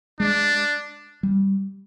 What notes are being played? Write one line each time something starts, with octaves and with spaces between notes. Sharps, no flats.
G#3 D4
G3